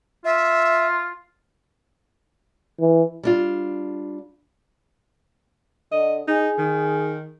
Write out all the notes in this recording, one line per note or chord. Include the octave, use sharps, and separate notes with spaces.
F4 E5
E3
G3 D4 F4
D3 D#5
D#4 G#4
D#3